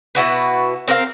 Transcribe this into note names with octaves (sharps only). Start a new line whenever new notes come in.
B2 E4 F#4 B4
C4 A#4 C5 F5